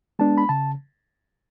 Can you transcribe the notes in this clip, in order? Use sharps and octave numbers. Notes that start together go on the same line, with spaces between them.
G#3 B3 D4 A5
B5
C#3 A5